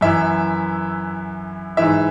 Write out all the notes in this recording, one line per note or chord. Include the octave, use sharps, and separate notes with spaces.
F#2 E3 E5
G#2 E3 E5